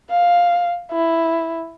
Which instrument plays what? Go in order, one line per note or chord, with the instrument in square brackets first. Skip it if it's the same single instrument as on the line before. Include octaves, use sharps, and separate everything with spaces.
[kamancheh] F5
E4